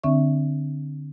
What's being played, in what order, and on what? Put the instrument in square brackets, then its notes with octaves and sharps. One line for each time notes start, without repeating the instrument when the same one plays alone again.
[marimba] D3 C4 D4 E5 C#6